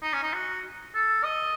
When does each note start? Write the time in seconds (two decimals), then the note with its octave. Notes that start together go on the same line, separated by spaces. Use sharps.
0.02 D#4
0.13 C#4
0.23 D#4
0.33 F#4
0.94 A4
1.24 D#5